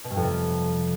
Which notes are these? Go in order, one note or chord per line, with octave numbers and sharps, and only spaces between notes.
B2
G2
F2
C3